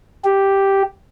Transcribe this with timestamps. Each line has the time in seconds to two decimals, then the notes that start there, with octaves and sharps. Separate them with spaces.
0.25 G4